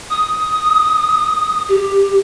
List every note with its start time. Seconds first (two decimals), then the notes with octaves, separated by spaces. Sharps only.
0.10 D#6
1.69 G4